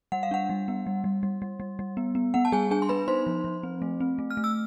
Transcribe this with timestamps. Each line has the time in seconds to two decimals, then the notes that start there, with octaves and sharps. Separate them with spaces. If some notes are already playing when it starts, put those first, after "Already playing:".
0.12 G3 F#5
0.23 F5
0.31 D4 F#5
0.50 G3
0.68 B3
0.87 G3
1.04 G3
1.23 G3
1.42 G3
1.60 G3
1.79 G3
1.97 B3
2.15 B3
2.34 B3 F#5
2.45 A5
2.52 G3 G#4 G#5
2.71 D4 G#4 G#5
2.82 C6
2.89 B3 B4 B5
3.08 D#4 C5 C6
3.27 F3
3.44 F3
3.63 C4
3.82 A3
4.00 C4
4.19 A3
4.30 F6
4.37 A3
4.44 E6